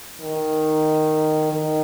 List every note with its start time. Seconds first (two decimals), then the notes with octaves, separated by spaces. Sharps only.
0.21 D#3
1.52 D#3